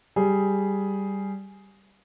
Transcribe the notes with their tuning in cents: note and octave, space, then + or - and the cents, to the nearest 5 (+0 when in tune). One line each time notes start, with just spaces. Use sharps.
G3 +0 G#4 +5